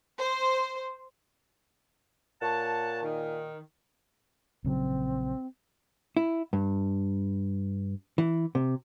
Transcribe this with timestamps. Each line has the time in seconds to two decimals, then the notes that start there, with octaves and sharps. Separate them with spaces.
0.18 C5
2.42 A#2 C#5 F#5 A5
3.03 D#3
4.64 A#1 C#3 F#3 C4
6.17 E4
6.53 G2
8.18 E3
8.55 C3